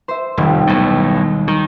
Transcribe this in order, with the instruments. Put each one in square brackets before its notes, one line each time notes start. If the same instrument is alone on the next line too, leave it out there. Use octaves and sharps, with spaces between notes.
[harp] C5 E5
[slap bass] F1 [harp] D#2 G3
[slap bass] B1 A2
[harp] G#3
[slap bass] D#3